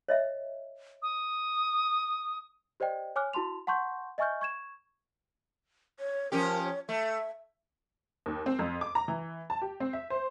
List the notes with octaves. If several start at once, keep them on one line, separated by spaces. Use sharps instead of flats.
C#5 D#5 E5
D#6
G4 C5 D5 D#5 G5
C#5 G#5 D6 F6 F#6
E4 F#4 A5 C6 F7
F#5 A5 C6 C#6 G6
D#5 E5 G#5 C#6 F6 G6
C#6 G#6 E7
C#5
F3 C#4 G4 A#4
C#5
A3 E5
D#2
C4
F2
D6
A#5
E3
A5
G4
C4
E5
C5